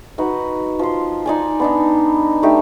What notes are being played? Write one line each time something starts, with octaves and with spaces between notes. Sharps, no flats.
D#4 F#4 B4 F#5
F3 C6
D#4 D5 G#5
B3 D4 D#4
A3 D4 D#4 G4